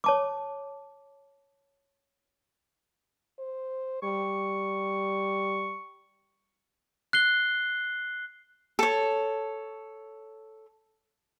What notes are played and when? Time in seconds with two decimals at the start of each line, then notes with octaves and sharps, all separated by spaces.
0.04 C#5 A5 D6
3.39 C5
4.03 G3 C#6
7.13 F#6 C7 G7
8.79 A4 C#5